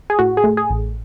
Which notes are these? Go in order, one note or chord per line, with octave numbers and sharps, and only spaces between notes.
G#4
A2 F#4
G#4
A3
G#4
A1